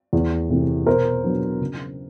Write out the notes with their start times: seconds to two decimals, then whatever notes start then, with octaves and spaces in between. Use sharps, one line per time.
0.13 E2
0.50 C3 E3 A3
0.86 B2 A#4 C5
1.24 F#3 B3 D4
1.61 C#3